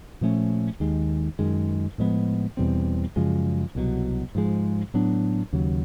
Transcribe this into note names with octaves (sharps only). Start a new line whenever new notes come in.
A#2 F3 A3 C#4
D#2 D#3 G#3
F#2 D#3 G#3
A2 F3 G#3 B3
E2 B2 G3 C4
F#2 C#3 F3 G#3
C2 B2 F#3
G#2 F3 G#3
A2 F#3 B3 D4
D#2 C#3 F#3